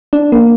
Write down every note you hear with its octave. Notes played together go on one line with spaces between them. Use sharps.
D4
A#3